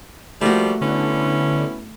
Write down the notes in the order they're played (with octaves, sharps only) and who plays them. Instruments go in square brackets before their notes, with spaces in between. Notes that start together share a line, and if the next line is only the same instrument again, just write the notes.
[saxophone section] F3 G3 A#3 [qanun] A3 F#4
[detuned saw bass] D3 [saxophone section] B3 C#4 E4